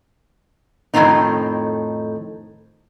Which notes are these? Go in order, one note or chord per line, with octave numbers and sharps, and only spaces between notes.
F2 A2 C3 D#3 C4 D#4